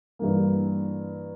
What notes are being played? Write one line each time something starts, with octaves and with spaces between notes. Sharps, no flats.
G2 E3 A#3